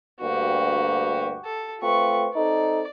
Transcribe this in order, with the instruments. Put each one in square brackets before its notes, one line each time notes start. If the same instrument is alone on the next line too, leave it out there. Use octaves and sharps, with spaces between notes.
[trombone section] D2 G2 A#3 [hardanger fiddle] F#4 G4
[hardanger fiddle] A4
[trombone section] A3 C4 F4 [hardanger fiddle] B4 C#6
[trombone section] C4 D#4 A4 [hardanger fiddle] D5